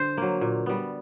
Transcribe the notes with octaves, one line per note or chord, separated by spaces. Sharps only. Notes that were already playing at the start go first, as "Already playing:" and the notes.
Already playing: D3 C5
F#3 A#3
A#2
G3 B3